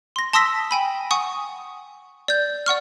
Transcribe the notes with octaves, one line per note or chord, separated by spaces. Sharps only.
C6 A#6
A5 C6 D#6 E6 A#6 B6
G5 G#5 B5
F#5 G#5 C#6 D#6
D5 G6
D5 F#5 C#6 F6